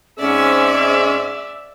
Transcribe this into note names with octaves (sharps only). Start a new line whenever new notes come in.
G#2 C4 C#4 G#4 D5 E5